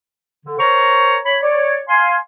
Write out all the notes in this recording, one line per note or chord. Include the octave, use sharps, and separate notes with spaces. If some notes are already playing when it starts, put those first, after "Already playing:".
D3
A#4 C5 C#5 A#5 C#6
C#5 B5
C#5 D5
F5 G#5 C6